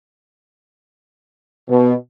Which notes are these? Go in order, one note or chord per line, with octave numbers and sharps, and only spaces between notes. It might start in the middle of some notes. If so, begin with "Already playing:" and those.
B2